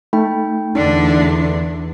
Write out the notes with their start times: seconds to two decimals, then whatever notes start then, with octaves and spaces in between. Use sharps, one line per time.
0.13 A3 D#4 G5 B5
0.75 E2 D3 D4 D#4